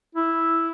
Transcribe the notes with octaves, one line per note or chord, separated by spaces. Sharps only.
E4